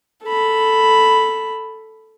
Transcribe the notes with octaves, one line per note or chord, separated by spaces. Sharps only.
A4 B5